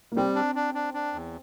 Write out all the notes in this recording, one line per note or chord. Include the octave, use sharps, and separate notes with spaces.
A#3
G3 C4
D4
D4
D4
D4
E2